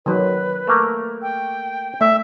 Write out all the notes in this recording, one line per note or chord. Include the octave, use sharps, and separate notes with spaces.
D#3 F#3 B4
A3 A#3 A#4
G5
A3 E5